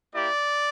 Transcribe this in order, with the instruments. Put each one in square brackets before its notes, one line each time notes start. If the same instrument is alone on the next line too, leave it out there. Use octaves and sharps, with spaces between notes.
[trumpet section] A#3 E4 G4 D5